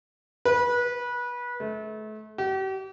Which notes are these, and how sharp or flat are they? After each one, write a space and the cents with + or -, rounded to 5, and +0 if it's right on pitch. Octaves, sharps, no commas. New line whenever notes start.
B4 -25
A3 -35
G4 -40